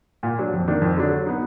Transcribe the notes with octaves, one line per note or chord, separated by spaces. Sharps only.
A#2
F#3 D4
F2
D#3 A#3 D4
F2
D3 F#3 D4
F#3
B3 D#4